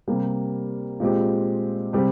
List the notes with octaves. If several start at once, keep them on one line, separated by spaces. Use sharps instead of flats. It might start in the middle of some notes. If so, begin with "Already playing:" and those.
C3 G3 A#3
A#2 G#3 C4 G4
C3 G3 C4 G4